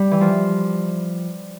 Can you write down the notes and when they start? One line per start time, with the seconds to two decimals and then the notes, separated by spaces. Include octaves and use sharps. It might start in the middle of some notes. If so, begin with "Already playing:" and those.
Already playing: G3
0.11 E3
0.21 F3